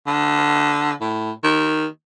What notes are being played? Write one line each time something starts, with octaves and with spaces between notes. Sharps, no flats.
D3
A2
D#3